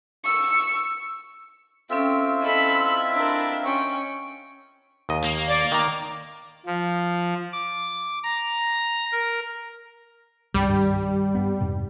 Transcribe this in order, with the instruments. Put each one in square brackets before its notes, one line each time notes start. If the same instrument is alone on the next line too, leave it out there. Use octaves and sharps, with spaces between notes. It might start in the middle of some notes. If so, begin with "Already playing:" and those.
[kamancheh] C#6 E6
[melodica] C4 F4 E5 [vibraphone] C#4 A4 [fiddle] G5
[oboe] E4 [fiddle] A4 B5 [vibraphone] D#5
[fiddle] D4 A#4
[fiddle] C#4 G5 [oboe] C#6
[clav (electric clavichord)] D#2 D#5
[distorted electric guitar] A#3
[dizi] D5
[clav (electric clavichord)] D#3 A#5 [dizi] D6
[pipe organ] F3
D6
A#5
A#4
[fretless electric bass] C2 G2 [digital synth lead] G3
[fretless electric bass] G2 D#3
G2 B3
F2 G#2 C3